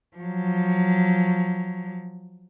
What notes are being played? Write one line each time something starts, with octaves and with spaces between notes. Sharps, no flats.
F3 F#3